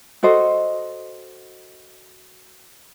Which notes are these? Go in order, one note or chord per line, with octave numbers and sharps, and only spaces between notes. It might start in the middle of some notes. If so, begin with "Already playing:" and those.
F#4 A4 C5 D#5